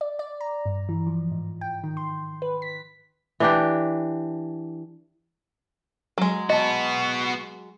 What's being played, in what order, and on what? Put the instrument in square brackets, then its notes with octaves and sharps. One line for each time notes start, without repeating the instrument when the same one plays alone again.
[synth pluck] D5
D5
A#5
G2
E3
F3
G#2
G5
D#3
C6
B4
B6
[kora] E3 D4 G4
[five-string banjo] F#3 G#3
[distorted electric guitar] B3 F#4 [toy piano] D#5 A5